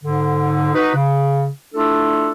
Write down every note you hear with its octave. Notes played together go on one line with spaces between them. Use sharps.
G#2 D3
D#4 F#4 B4
C#3
A3 D4 E4 F4 A4